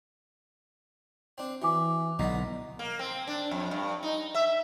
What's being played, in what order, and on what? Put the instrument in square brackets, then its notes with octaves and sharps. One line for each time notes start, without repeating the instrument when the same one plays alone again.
[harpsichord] C4 D4
[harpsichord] E3 [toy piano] F#4 G#5 D6
[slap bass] B1 B2 [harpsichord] D3 D#4
[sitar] A#3
C4
D4
F2
G2
D#4
E5